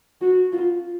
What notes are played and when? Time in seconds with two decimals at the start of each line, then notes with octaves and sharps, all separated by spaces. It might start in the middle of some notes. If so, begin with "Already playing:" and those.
0.22 F#4
0.53 F4